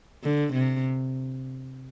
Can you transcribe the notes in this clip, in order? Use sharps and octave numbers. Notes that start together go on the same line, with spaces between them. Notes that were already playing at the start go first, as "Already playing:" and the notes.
D3
C3